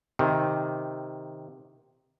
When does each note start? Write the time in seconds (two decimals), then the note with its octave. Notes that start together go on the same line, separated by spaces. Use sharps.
0.19 C3 D#3